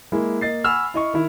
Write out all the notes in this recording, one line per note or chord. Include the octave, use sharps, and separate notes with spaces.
G#3 A#3 E4
A#3 D#5 A6 C7
F#5 G#5 B5 C#6 E6 F6
E4 D#5 C#6
D#3 E4